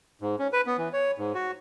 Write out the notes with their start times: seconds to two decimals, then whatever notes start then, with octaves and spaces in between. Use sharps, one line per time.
0.21 G#2
0.39 C#4
0.53 B4
0.66 B3
0.78 E3
0.93 C#5
1.18 G#2
1.34 F#4